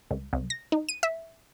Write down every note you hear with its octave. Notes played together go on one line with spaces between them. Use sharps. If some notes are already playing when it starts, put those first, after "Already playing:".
C#2
C2
A#6
D#4
D#7
E5